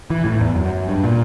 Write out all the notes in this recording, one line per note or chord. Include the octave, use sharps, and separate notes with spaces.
E3
A2
E2
F#2
G2
A#2